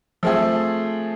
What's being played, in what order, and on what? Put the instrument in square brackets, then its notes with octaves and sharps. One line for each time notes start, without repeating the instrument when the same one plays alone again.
[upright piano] F3 A3 C4 G#4